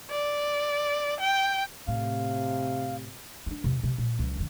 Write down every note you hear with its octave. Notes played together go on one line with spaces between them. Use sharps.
D5
G5
A2 C3 F5
C#4 D4
E2 C3
C3
A#2
C#2 F#3
F2 D3